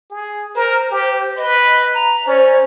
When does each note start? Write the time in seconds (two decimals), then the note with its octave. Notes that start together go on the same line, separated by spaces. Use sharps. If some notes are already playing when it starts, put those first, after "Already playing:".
0.10 G#4
0.55 A#4 C5
0.91 G4
1.37 B4 D#5
1.94 A#5
2.27 C#4 C5 D5